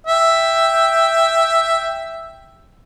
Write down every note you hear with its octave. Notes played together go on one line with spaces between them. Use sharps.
E5 G5